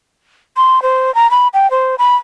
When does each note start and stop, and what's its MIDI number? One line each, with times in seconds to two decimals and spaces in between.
0.57 0.82 84
0.82 1.14 72
1.15 1.29 82
1.31 1.48 83
1.54 1.70 79
1.71 1.95 72
1.99 2.15 83